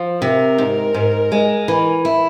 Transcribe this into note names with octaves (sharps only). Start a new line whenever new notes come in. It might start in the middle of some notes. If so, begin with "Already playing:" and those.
Already playing: F3
C3 A#4
G#2
G#2
G#3
E3
E4